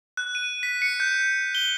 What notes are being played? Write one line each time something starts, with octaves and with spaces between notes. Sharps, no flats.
F#6
D#7
B6
C#7
G6
G7